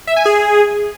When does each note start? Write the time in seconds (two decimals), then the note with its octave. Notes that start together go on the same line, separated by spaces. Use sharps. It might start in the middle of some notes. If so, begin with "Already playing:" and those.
0.07 E5
0.16 G#5
0.25 G#4